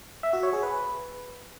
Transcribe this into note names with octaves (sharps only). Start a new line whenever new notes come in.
E5
F#4
C#5
G#4
B4